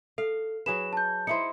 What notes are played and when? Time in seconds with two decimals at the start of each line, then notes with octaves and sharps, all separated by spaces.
0.18 A4 F5
0.66 F#3 G#4 B4 E7
0.93 A5 G6
1.27 D#4 E4 C5 C#7